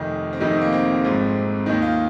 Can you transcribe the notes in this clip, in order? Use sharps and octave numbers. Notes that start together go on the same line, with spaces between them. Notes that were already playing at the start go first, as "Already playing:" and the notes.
Already playing: F1 F2 D#3 D#4
C4
F1 F2 C3 D#3 D#4
C4
A#3
C4
G#1 G#2 F3
D#2 D#3 D#4
F4